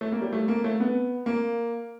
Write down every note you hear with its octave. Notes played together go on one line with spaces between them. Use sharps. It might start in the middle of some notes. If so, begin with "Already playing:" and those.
A3
A#3
G3
A3
A#3
A3
B3
A#3